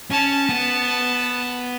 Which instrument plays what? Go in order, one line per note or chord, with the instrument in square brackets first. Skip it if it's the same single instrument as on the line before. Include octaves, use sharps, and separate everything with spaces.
[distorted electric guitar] C#4 [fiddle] A5
[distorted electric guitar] B3